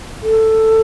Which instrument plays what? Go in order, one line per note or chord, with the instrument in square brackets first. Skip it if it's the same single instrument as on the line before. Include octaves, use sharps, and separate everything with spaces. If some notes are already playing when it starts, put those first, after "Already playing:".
[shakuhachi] A4